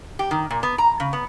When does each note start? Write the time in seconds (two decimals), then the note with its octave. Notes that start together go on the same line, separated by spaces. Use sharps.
0.19 G4
0.31 D#3
0.50 A#2
0.63 B3
0.78 A#5
1.00 C#3
1.13 B3